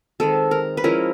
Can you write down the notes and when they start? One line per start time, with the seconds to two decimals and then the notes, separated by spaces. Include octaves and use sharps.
0.20 D#3 G#3 C4 A4
0.51 A#4
0.77 B4
0.84 F3 G#3 C#4 E4 A#4